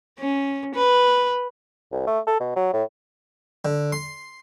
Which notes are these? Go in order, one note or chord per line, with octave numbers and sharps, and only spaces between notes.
C#4
B4
C2
A3
A4
B2
F#3
A2
D3
C6